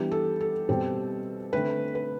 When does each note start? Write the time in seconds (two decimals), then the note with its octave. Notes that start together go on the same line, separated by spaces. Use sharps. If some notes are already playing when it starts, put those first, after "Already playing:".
Already playing: E3 G3 B3 D4 G4
0.12 A4
0.41 A4
0.69 B2 G3 C4
1.53 D3 A3 C4 B4
1.95 B4